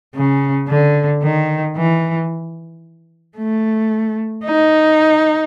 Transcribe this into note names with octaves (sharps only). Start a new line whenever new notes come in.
C#3
D3
D#3
E3
A3
D#4